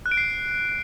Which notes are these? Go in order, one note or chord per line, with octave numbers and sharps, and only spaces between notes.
F#6
D7
C7